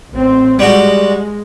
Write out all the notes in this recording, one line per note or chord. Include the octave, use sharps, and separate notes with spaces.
A1 C4
G3 G#3 F#4